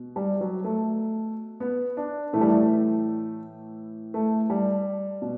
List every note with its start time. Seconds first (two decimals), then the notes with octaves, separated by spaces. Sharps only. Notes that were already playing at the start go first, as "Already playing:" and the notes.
Already playing: B2
0.16 G3
0.41 F#3
0.64 A3
1.60 B3
1.97 D4
2.33 A2 E3 A3
2.41 G3
2.48 A3
4.14 A3
4.50 G3
5.22 B2